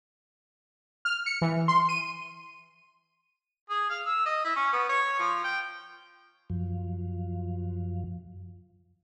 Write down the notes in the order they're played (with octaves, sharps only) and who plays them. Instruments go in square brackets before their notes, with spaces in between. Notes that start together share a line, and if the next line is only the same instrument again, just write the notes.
[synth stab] F6
C#7
E3
C6
D#7
[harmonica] G#4
F5
E6
D#5
E4
C#4
B3
C#5
F3
G5
[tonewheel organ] F#2 F3